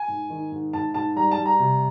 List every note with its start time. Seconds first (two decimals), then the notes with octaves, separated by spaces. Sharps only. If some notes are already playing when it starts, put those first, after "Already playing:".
Already playing: G#5
0.08 G#2
0.30 D#3
0.52 G#2
0.73 G#2 A5
0.94 G#2 A5
1.16 G3 A#5
1.31 A5
1.38 G3
1.46 A#5
1.59 C3